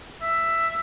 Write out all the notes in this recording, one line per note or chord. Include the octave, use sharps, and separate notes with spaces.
E5